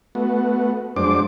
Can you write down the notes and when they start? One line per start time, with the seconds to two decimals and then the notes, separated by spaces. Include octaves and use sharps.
0.15 A3 B3 F#4
0.96 F2 F#3 G#3 D4 C5 D6